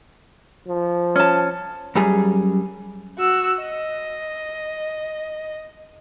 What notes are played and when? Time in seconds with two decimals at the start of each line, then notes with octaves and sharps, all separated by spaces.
0.67 F3
1.16 C#4 A5
1.95 F#2 G3 G#4
3.19 F#4 E6
3.60 D#5